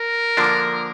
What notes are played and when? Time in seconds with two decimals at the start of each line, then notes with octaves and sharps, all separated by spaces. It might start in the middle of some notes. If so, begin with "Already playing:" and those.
Already playing: A#4
0.37 D3 F3 A#3 D4